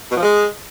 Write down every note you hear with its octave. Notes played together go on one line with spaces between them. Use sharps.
B2
F3
G#3